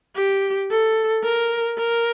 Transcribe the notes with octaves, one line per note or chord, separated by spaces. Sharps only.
G4
A4
A#4
A#4